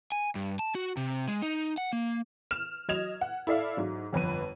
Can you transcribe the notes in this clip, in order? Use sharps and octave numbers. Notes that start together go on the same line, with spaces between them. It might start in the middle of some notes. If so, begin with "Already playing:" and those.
G#5
G2
A5
F#4
C3
G#3
D#4
F#5
A#3
F6 E7
F#3 D#5 G#6 E7 F7
F#5
E4 A4 D5 E5 F5
G#2 F#3
G1 F2 B4 D#7